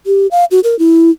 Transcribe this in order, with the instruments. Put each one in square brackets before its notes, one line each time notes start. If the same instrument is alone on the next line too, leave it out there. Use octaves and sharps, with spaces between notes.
[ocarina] G4
F5
F#4
A#4
E4